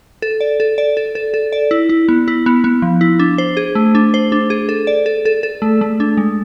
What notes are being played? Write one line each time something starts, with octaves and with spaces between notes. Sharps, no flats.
A4
D5
A4
D5
A4
A4
A4
D5
E4
E4
B3
E4
B3
B3
F3
E4
D4
C5
G#4
A3
D4
C5
D4
G#4
A4
D5
A4
A4
A4
A3
A3
D4
G#3